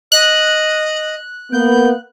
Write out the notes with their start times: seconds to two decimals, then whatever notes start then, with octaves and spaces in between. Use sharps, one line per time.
0.12 D#5 F#6
1.52 A#3 B3 G6